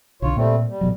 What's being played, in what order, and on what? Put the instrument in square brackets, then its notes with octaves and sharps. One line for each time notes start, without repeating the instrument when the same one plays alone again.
[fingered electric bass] B1 D3 [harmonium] F4 C#5
[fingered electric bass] A#2 [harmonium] G3 A3 C4
[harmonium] G3
[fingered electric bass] A1 B2 F#3